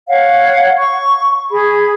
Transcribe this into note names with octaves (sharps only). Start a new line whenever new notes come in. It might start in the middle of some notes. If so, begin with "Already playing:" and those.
C#5 F5 F#5
C#6
G#4 B5